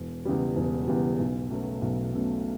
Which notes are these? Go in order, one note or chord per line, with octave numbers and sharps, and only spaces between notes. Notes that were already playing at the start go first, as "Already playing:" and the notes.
Already playing: E1
E2 C#3 G3
E1
E2 C#3 G3
B1
B2 F#3 A3 C#4
B1
B2 F#3 A3 C#4